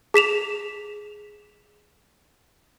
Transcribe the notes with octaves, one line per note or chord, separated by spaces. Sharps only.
G#4 B6 E7 F7